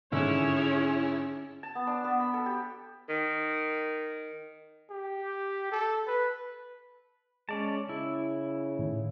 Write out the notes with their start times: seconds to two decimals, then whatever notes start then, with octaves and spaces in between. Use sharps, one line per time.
0.12 G#1 D3 C#4 E4 G#4 C#5 E6
1.63 A5
1.75 B3
1.87 D4
2.04 B3
2.20 B5
2.34 A4
2.46 G4
3.09 D#3
4.90 G4
5.71 A4
6.07 B4
7.49 G#3 C#4 D5 A5
7.89 C#3 E4
8.79 A2 D#3